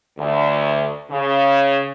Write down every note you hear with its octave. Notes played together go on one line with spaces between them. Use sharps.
D2
C#3